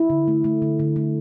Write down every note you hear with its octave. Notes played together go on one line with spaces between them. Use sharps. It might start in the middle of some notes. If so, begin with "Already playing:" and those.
Already playing: E4
D3
A3
A3
D3
D3
A3